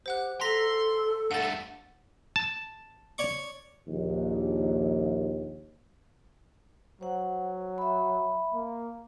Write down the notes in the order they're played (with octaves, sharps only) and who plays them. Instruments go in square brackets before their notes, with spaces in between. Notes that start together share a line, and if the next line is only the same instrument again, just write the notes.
[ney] G4 [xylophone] C5 F#5 F#6
[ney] A4 [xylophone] A#5 A#6 B6 [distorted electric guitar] C6
[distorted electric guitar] G2 A3 [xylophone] F#5 A6
[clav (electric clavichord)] A5
[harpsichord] C#5 D5 C#6
[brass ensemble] A#1 D#2
[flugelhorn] F#3 [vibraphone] C5 F#5
[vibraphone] E5 B5
[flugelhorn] A#3